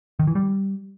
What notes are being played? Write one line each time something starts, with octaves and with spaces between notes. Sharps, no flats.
D#3
E3
G3